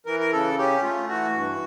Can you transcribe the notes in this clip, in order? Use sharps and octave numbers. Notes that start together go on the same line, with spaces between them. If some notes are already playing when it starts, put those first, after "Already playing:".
E3 A#4
A#4
C#3 A4
C#4 G4
A3 F4
E3 F#4
G2